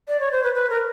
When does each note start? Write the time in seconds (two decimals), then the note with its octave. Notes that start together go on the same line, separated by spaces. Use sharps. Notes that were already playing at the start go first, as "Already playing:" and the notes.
0.08 D5
0.20 C#5
0.31 C5
0.43 B4
0.55 B4
0.70 A#4